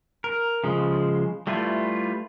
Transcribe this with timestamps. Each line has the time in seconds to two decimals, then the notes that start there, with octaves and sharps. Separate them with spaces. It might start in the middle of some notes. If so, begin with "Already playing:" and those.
0.24 A#4
0.64 C#3 F3 G#3
1.47 G3 A3 E4 F4 B4